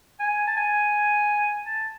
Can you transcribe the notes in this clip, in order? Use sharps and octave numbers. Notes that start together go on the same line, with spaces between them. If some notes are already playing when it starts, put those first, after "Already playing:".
G#5
A5
G#5
A5